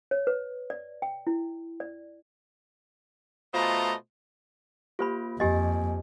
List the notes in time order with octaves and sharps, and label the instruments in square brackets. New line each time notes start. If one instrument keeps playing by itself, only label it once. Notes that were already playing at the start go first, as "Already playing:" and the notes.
[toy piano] C#5
B4
D5
G5
E4
D5
[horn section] B2 A3 F4 C5 D#5 A#5
[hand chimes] A#3 F4 [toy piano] G4 C5 B5
[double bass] F2 [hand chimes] A#3 G#5 [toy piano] G4 D#5